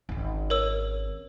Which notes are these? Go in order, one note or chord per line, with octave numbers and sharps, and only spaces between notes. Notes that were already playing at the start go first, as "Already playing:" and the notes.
G#1 C#4
A#4 C#5 E6